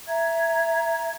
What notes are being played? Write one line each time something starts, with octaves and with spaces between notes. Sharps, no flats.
E5 A#5 G#6